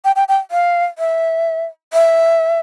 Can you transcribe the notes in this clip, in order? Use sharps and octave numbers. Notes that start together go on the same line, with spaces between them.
G5
G5
G5
F5
E5
E5